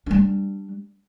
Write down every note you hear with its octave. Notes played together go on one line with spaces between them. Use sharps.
G3 D4